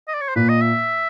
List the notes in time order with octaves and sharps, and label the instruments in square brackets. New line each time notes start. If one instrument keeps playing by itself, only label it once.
[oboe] D#5
D5
C#5
C5
[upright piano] A#2 [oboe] B4
[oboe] D#5
E5